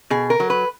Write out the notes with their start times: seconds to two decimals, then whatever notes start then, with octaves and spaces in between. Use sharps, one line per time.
0.10 B2 G#4
0.30 A#4
0.40 F#3
0.50 B4